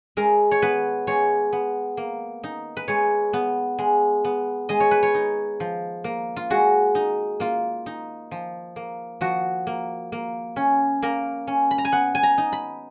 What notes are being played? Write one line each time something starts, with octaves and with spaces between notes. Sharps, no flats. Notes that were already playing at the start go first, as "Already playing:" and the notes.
G#3 A#4
C#5
B3 B4
G#3 C#5
B3
A#3
D#4
B4
G#3 C#5
B3
G#3
B3
G#3 D#5
C#5
B4
C#5
D#4
F3
A#3
F4
G#3 F#4
D#4
A#3 F4
D#4
F3
A#3
F3 F#4
A#3
A#3
C#4
A#3 A#4
C#4
B5
A#5
G#5
B3 F#5
G#5
A#5
D#4
B5